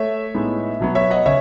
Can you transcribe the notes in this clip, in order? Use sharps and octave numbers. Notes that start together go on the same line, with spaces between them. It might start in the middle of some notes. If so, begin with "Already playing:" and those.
Already playing: A3 C#5 E5
A2 G#3 B3 D#4
B2 F#3 B3
C#5 E5
D#5 F#5
C#3 C#5 E5